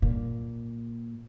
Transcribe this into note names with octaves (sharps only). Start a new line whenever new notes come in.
A#2